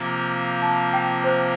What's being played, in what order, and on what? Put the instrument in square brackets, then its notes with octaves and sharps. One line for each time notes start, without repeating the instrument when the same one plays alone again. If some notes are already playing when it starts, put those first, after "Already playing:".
Already playing: [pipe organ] C3 F3 A#3
[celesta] A5
G5
C5